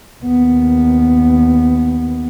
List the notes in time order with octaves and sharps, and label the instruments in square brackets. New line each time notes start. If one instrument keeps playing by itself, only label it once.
[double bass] D#2 B3